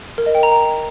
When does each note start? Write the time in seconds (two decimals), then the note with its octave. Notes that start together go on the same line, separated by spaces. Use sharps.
0.18 A#4
0.26 D#5
0.35 G5
0.43 A#5